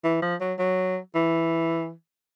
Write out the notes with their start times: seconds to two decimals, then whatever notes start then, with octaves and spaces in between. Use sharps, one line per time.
0.04 E3
0.22 F3
0.40 F#3
0.59 F#3
1.15 E3